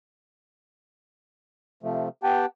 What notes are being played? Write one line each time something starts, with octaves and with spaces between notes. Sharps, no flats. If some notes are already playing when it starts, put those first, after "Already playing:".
C3 F3 A3
B3 G4 F#5 G5 A5